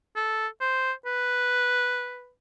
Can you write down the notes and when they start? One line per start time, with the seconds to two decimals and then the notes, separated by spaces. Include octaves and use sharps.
0.16 A4
0.61 C5
1.06 B4